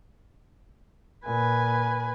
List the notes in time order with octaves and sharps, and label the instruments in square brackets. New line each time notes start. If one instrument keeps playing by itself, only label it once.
[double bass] A#2 [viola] B4 G#5